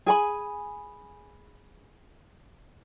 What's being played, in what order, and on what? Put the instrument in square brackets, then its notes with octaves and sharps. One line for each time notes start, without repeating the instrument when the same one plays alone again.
[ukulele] G#4 G#5 B5